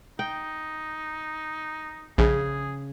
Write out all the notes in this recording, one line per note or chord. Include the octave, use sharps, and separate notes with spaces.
D#4 G5
A#1 C#3 G#4